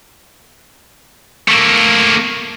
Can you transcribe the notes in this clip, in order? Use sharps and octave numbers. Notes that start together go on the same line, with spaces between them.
A3 A#3